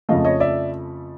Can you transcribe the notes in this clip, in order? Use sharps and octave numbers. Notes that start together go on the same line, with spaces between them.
F2 C#3 F3 A3 D#5 F5
C#5 D#5
D5 E5